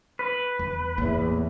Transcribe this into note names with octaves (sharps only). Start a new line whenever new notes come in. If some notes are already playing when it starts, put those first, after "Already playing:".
B4
E2
E2 A2 E3 A#3